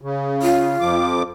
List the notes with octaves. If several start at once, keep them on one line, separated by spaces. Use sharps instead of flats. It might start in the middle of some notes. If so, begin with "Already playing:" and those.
C#3
F4
F2 F3 D6